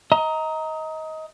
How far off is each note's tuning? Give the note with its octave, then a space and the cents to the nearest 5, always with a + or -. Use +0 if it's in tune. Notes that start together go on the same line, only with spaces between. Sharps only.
D#5 +25 A#5 +0